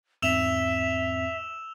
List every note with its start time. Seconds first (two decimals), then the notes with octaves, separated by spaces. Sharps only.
0.22 E2 G#2 C4 E5 E6 E7 F7